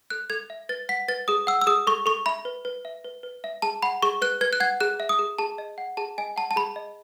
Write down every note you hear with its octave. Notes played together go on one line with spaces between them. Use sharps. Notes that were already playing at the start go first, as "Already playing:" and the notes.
A4 F#6
A4 G#6
E5
B4 A6
F#5 B6
B4 A6
G#4 D#6
F#5 E6
E6
G#4 D#6
A4 C#6
A4 C#6
E5 B5
B4
B4
E5
B4
B4
E5
G#4 A5
F#5 B5
G#4 C#6
B4 F#6
B4 G#6
F#6
F#5 G#6
G#4 F#6
E5
D#6
G#4
G#4 A5
D#5
F#5
G#4 A5
D#5 G#5
F#5 A5
A5
G#4 B5
D#5